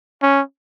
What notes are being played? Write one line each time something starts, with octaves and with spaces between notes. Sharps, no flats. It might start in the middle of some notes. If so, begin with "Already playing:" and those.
C#4